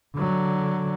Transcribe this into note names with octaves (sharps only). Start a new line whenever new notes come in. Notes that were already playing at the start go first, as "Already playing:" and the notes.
D3 F#3